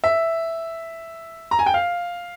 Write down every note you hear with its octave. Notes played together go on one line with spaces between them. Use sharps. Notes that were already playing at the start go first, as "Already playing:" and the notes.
E5
A#5
G#5
G5
F5